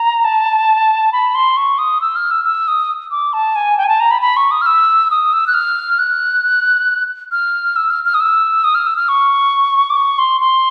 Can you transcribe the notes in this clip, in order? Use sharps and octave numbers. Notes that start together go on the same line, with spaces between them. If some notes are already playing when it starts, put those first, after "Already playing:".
Already playing: A#5
A5
B5
C6
C#6
D#6
E6
F6
E6
E6
D#6
D6
A5
G#5
G5
G#5
A5
A#5
B5
B5
C#6
D#6
F6
E6
D#6
E6
F#6
F6
F#6
F6
E6
F6
F6
D#6
E6
D#6
F6
E6
F6
C#6
D6
C#6
C6
C6